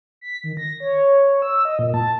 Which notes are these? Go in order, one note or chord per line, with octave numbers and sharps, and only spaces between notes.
B6
D#3
A#6
C#5
E6
D#5
A#2
A5